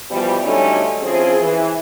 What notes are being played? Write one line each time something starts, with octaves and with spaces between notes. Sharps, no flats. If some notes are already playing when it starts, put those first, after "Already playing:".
B2 E3 F3 G3
D3 F#3 G3 A3 C#4 D#4
F3 C4 C#4 E4 G#4
E3